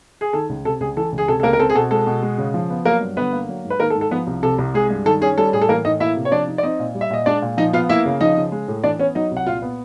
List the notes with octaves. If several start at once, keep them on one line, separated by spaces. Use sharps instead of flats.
G#4
D#3 A4
C#2
C3 A4
C#2 G#4
E3 A4
C#2
G#4
C3 A4
A4
C#2 A#3 A#4
A#4
C4 A4
G#4
B2 A4
G#3 A4
B2
G#3
C#3
F3
B3
F#3 A#3 A#4
G2
D3 B3 B4
A#3
F#3
G#2
B4
D#3 A#3 A#4
A4
G#2
A4
F3 B3 B4
C2
C3 A4
C2
G#3 G#4
G2
D#3 A4
C#4 G#4
G3 A4
A2 G#4
A4
E3 A#3 A#4
A2 D#4 D#5
A#3 E4 E5
C3
C#5
F3 D4 D5
D#4
D5
C4 D#4 D#5
A#2
G3
E5
A#2 D#5
G#3 D4 D5
A#2
F3 D#4 D#5
B3 F4 F5
A#3 E4 E5
C#3
F3 D#4 D#5
C#3
G#3
A2
E3 D4 D5
B3 C#4 C#5
F#3 D#4 D#5
C2
F#5
A#2 F4 F5
B3